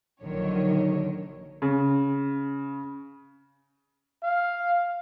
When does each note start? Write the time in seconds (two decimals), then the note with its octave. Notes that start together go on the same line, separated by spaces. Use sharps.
0.23 A#1 D3 D#3 F#3 C#5
1.62 C#3
4.23 F5